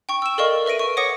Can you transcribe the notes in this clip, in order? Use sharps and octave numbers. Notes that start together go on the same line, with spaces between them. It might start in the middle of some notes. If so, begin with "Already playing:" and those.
G5 C#6
E6 E7
A4 A#4 D5 D#5 F5 C#6
B4 E5 A#6 D7 D#7
C#6
C#5 F#5 D6 D#6 A#6 C#7